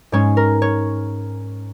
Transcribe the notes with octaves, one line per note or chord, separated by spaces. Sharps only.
G#2 G#3 C#4 C#5
A#4
C#5